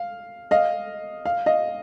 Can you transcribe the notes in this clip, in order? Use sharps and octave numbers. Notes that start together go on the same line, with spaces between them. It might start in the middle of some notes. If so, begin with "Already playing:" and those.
Already playing: F5
D#5 F5
F5
D#5 F5